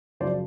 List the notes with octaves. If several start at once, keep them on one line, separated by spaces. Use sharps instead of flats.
F#2 C#3 F3 C5 D5